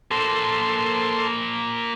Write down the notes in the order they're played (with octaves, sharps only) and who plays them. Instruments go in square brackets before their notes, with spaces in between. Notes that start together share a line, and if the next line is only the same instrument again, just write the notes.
[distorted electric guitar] A#3 C5 [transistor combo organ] A4 C6